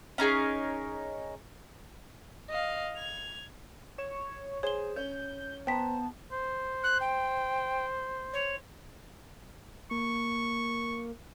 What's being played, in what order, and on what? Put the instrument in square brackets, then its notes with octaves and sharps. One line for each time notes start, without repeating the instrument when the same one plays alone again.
[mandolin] C#4 D#4 G#4 A#4
[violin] D#5 F5
G#6 F7
[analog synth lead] C#5 [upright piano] E7
[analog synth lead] G#4 [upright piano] C5 [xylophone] C#5 G7
[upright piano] C#4 [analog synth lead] G6
[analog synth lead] B3 [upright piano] C5 A#5 [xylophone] G5 B6 [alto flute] A5
[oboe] C5
[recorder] F#6
G5
C#5
[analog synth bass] A#3 [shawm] C#6